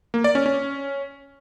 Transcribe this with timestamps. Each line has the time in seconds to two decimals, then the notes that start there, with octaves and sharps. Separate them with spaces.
0.14 A#3
0.24 D5
0.35 C#4
0.46 C#4